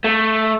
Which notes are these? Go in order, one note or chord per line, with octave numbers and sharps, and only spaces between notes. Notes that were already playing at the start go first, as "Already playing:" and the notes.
A3